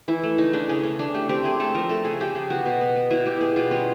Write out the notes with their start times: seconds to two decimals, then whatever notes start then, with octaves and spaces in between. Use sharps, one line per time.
0.08 E3 E4
0.23 A3
0.38 C#3 D#4
0.53 C#3 D4
0.69 C#3 C#4
0.83 C#3 C#4
0.99 A3 D4
1.15 A3 G4
1.29 C4 G4
1.44 A3 G#4
1.60 A3 A4
1.75 F3 A#4
1.89 A3 A4
2.05 C#3 G#4
2.20 C#3 G4
2.35 C#3
2.50 B3 F#4
2.66 B2
2.81 B3
2.96 B3
3.11 B2 E4
3.26 B2 G4
3.41 B3 G#4
3.56 B2 F4
3.71 G3 C#4